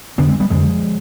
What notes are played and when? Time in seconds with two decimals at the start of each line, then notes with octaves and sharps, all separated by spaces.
0.18 F2 D3 B3 D4
0.28 G#3 C4
0.40 G3 B3
0.50 F2 D3 F3 G#3